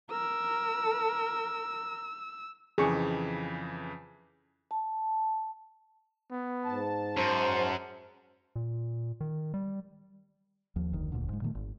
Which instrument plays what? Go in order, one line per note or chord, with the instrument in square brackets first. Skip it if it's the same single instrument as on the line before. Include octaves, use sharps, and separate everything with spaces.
[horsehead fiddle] A#4 [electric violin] E6
[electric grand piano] F2 C#3 E3 [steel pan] G#4 C#6
[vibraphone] A5
[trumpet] B3
[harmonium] G#2 A5
[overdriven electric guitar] F#2 [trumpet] C5
[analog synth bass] A#2
D#3
G3
[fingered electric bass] D#2 F3
F1 D2 D#3
E1 D2 A#2 D3
G#2 G#3
A#2 D#3 A3
G#1